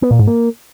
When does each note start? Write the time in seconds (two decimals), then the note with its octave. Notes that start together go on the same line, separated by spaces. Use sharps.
0.02 B3
0.11 A#2
0.19 G#2
0.27 A#3